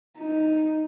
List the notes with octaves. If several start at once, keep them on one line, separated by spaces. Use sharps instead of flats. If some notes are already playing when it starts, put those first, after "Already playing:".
D#4